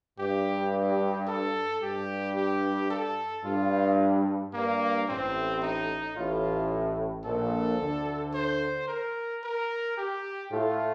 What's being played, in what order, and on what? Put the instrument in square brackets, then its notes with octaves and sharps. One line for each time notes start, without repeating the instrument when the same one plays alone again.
[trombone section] G2 [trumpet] G4
[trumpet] G4
A4
[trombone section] G2 [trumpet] G4
[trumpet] G4
A4
[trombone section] G2 [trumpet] F4
[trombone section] G2 [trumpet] A#3
[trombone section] A1 A2 [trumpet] C4
[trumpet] D#4
[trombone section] A1 A2 [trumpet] F4
[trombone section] A#1 A#2 [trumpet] A4
[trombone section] D2 D3
[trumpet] C5
A#4
A#4
G4
[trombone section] A2 A3 [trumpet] F4